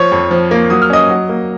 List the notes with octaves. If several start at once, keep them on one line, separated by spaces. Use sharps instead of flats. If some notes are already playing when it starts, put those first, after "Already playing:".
Already playing: F3 C#5 C#6
F2
F3
A#3
F#3 D#6
F6
C#4 D#5 D#6
F#3
A#3